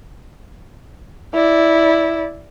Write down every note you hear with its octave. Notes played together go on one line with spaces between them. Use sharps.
E4 D5